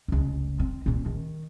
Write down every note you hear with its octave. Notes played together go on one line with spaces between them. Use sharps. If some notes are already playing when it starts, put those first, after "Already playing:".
F1 C#2
C4
A#2 A#3
D#3